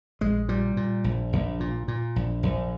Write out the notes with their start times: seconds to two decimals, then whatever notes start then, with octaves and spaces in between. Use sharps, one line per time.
0.21 A#1 G#3
0.48 A#2 G3
0.77 A#2
1.04 A#1
1.33 A#1
1.60 A#2
1.88 A#2
2.16 A#1
2.43 A#1